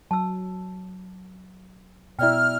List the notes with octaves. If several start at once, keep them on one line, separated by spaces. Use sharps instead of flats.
F#3 A5 E6
B2 E4 D5 E5 G5 F6